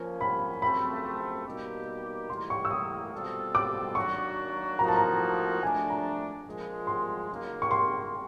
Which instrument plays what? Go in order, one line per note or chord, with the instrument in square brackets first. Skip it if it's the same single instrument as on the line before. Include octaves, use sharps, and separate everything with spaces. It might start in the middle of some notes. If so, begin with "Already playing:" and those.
Already playing: [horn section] F3 A#3 C#4
[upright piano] B5
[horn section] F#2 C#3 F3 A3 C4 [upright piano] B5
[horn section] B2 G3 A#3 D#4 G4
[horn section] A2 E3 G3 A#3 [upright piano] C6
[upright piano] C#6
E6
D#6
[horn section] B2 G3 C4 F4 A4
[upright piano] D6
[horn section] D#3 F#3 A#3 D4 F#4 [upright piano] C#6
[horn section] A2 F3 A#3 D#4 F#4 [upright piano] A#5
[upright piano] A5
A#5
[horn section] F3 A3 D4 [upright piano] G#5
[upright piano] A#5
[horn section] A#2 F3 G#3
[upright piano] C6
[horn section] C#3 F#3 A#3 D#4
[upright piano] C#6
C6